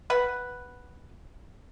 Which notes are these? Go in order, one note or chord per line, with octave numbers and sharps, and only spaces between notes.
B4 F#5